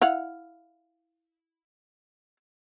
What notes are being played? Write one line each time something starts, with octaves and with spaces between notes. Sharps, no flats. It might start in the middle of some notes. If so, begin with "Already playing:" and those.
E4 F5 F#5